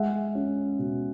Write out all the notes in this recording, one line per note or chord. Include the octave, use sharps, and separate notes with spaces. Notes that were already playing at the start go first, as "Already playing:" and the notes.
Already playing: G#3 E5 F#5
C#4
B2